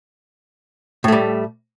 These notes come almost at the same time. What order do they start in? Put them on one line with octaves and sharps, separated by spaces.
A2 A3 G3